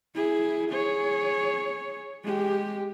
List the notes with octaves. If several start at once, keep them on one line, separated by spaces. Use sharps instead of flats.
E4 G#4
G#4 C#5
G#3 G4